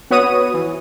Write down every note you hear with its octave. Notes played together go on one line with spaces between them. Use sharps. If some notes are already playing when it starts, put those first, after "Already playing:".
B3 F#4 B4 C#5 D#6 D#7
E3